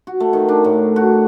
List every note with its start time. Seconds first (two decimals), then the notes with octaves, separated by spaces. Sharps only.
0.07 F#4
0.20 A3
0.33 D#3
0.49 D4
0.64 A2
0.96 F#4